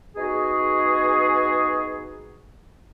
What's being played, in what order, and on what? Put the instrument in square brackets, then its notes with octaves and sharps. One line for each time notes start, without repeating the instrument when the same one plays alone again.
[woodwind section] B3 D#4 F#4 G#4